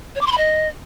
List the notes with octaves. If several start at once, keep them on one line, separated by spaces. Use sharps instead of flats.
C#5
D6
C6
B5
D#5